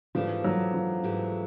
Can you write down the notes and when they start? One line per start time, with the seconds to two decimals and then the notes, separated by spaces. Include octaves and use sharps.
0.15 G#2 E3 F3 A3 D4 G4
0.44 F#3
0.74 F3
1.03 G#2 E3 A3 D4 G4